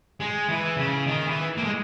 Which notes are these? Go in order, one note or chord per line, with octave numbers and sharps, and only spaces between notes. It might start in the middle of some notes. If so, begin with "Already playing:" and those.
G#3
E3
C#3
D#3
E3
A#3
G#3